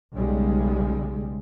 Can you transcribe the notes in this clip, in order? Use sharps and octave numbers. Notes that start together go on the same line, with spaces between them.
B1 C#3 G3 G#3